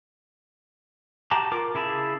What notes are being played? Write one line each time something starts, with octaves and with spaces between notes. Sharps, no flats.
F#4 G4 A5 A#5 D6
F4 A#4 D6
C#3 E4 G#4 A5